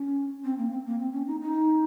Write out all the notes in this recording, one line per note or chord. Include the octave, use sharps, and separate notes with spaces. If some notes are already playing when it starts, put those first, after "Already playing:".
Already playing: C#4
C4
A#3
C4
A#3
C4
C#4
D#4
D#4